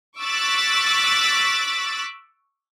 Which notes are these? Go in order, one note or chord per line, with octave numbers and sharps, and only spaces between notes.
C#6 D6 E6 F#6 A6 B6